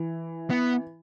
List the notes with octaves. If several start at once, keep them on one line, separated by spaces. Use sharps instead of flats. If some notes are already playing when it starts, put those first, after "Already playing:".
Already playing: E3
B3